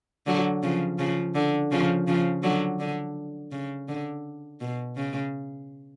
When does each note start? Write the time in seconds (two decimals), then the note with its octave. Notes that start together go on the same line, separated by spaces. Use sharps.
0.27 D3 F#3
0.63 C#3 F3
0.99 C#3 F3
1.35 D3
1.72 C#3 F3
2.07 C#3 F3
2.43 D3 F#3
2.80 D3
3.52 C#3
3.89 D3
4.61 B2
4.96 C#3